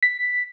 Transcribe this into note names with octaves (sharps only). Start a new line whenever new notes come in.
B6